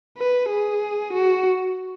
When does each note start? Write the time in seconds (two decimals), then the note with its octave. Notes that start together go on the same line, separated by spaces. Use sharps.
0.18 B4
0.49 G#4
1.13 F#4